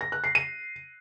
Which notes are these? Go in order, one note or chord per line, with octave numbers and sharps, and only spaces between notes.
A#6
F#6
C7
D#7